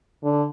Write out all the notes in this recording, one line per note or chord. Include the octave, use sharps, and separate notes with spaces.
D3